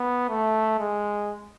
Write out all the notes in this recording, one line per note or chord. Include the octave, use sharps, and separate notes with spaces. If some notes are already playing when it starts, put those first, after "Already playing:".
Already playing: B3
A3
G#3